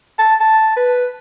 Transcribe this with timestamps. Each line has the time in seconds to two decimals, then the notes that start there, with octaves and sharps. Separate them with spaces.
0.19 A5
0.40 A5
0.77 B4